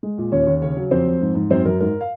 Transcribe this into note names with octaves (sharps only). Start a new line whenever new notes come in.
G#3
A#2
D#2 C#4 C#5
D#2
C#3 C#4 C#5
F#3
F2 C4 C5
F2
G#2
G#2
F#2 C4 C5
F#2 A#4
G#2 A#4
F5